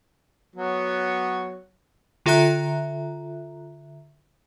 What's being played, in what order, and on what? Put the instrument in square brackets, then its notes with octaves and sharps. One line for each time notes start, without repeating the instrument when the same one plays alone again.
[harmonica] F#3 B3 C#5
[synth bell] D3 F4 A4 E5 A#5 F#6